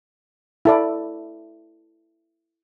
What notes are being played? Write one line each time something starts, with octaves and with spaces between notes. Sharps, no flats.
E4 A4 D5